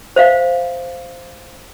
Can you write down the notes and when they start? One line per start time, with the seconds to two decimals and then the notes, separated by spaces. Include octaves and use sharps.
0.16 C5 E5 F5